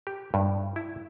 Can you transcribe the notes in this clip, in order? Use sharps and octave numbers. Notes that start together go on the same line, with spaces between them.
G4
G2
E4